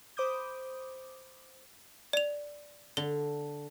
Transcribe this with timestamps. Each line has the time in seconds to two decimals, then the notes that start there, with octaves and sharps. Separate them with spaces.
0.17 C5 B5 D6 D#6 G6
2.13 D5 F7
2.97 D3 G7